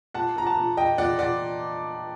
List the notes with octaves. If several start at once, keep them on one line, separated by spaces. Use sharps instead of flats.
A#2 F#5 A5
A#2 A#5
F#5 A5
A#2
A#2 D#5 G5
A#2 D5 F#5
A#2 D5 F#5